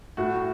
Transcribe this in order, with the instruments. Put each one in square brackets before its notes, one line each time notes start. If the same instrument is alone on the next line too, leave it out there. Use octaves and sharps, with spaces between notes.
[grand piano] A2 [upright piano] F#4